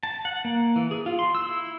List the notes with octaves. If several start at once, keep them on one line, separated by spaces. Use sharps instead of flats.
A5
F#5
A#3
E3
G#4
F4
C6
E6
E4